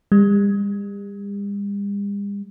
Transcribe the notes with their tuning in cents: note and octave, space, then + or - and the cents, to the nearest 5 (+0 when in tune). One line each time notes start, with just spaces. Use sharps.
G3 +45